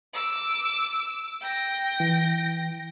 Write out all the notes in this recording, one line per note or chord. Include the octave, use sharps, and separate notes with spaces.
D6 E6
G5 A#6
E3